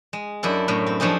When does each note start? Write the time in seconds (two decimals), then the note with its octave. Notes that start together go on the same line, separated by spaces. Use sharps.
0.13 G#3
0.43 F#2 D4 E4 A4
0.68 F#2 A2
0.87 C4
1.00 F3 A3 D4 D#4 G#4